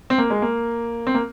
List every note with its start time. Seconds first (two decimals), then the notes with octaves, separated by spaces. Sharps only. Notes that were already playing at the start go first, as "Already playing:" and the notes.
0.10 C4
0.18 A#3
0.30 G#3
0.42 A#3
1.07 C4
1.15 A#3